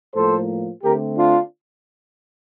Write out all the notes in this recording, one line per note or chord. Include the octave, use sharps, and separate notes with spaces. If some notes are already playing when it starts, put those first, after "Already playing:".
A2 F3 A#3 A4 C5
D3 A3 C4 G4 A#4
D4 F4